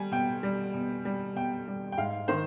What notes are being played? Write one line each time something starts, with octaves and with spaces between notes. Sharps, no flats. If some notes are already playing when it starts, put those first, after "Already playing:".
Already playing: G3 G#5
B2 G5
G3
B2
G3
B2 G5
G3
G5
G#2 F5
D#3 C5